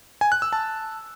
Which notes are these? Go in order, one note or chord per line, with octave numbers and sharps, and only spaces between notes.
G#5
F#6
E6
A5